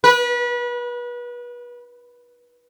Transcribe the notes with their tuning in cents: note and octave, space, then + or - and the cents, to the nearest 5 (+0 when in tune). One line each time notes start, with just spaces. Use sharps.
B4 -30